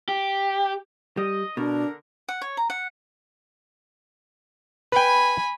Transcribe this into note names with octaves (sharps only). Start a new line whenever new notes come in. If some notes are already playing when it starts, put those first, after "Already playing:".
G4
G3 D#5
B2 D3 D4 A#4
F#5
C#5
A#5
F#5
B4 G5 G#5 B5